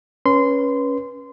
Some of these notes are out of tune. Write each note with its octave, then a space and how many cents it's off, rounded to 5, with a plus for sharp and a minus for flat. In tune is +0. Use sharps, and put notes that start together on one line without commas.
C#4 +0 B4 -20 C6 -20